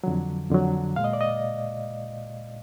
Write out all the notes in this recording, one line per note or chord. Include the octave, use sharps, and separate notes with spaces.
F2 D3 F#3
F2 D3 F#3
A#2 G#3 F5
D#5
D5
D#5